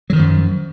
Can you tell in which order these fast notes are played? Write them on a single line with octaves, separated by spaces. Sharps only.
F#3 D#3 F3 F#2